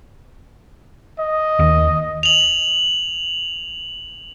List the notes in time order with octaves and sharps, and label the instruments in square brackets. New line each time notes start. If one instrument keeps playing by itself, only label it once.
[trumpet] D#5
[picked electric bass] D#2
[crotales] F7 F#7